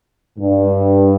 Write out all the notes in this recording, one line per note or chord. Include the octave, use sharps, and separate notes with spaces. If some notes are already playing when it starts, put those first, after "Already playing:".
G2